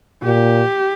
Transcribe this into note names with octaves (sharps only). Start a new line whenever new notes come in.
A#2 G4